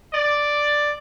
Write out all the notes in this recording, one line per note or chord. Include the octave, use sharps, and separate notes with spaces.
D5